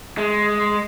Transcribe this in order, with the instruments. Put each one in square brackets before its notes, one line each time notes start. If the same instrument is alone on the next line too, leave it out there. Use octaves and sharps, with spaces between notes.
[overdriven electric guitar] G#3